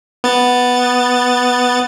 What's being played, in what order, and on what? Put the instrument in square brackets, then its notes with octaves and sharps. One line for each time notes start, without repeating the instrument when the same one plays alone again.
[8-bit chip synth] B3 A6